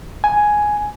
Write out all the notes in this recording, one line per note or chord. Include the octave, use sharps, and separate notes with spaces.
G#5